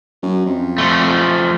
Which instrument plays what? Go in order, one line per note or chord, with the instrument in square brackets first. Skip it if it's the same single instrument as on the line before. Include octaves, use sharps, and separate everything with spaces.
[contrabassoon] F#2
F2
[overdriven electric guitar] F3 A3